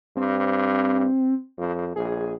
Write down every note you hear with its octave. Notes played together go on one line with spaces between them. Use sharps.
G2 C4
F2
A#1 G#4